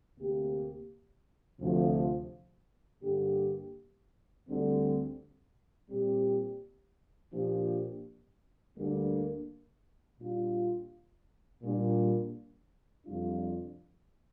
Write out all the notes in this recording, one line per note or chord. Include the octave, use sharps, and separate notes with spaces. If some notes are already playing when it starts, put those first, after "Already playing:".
D2 C3 A#3 G4
D2 C3 F3
G2 D3 A#3 G4
D2 D3 G3 C4
A#2 G3 C4 G4
A#2 F3 A#3 D4 G4
D2 D3 G3 A#3 D4
A#2 G3 D4 F4
A#2 G3 D4
F2 C3 G3 D4 F4